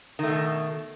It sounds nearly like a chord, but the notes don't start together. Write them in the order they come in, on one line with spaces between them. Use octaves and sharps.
D#3 A3 B2